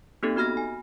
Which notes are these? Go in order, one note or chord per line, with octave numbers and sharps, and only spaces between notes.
A#3 C4 D#4 G4 A4
B3 F#4 B5 F6 A#6
G#5